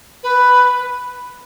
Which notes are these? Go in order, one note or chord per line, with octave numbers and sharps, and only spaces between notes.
B4